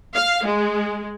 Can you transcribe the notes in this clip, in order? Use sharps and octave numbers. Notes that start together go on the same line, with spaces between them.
F5
G#3